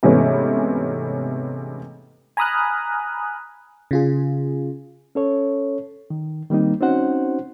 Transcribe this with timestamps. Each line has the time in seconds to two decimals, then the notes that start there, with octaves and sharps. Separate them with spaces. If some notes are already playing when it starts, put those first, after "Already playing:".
0.03 G#2 C3 E3 A3 B3 C#4
2.37 G#5 A#5 B5 D#6 F6 F#6
3.91 C#3 F4 G#4
5.15 C#4 A4 C#5
6.10 D#3
6.50 D#3 G3 A#3 C4 D#4
6.81 C4 C#4 D#4 F#4 C5 F#5